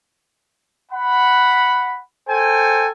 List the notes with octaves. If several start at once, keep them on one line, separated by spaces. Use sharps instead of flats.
F#5 B5
A4 C5 G5 G#5